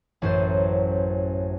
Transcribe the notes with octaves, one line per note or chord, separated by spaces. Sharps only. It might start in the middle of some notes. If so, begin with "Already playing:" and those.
A1 F#2 C5